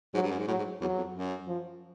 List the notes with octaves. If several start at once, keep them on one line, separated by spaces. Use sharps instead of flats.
G#2 F#3
G2
F#2
G#2
A2 F#3
G#2
E2 F#3
F2
F#2
F3